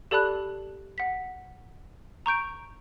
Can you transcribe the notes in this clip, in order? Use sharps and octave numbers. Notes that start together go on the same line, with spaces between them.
G4 A4 D5 A5 B5 F#6
F#5 B6
A#5 C#6 G6 D7